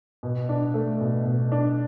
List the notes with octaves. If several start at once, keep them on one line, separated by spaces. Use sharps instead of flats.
B2
D4
A3
B2
B2
D4